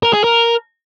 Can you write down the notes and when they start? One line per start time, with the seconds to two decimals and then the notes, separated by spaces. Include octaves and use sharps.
0.03 A#4
0.13 G#4
0.24 A#4